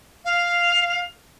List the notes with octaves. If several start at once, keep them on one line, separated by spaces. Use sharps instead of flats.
F5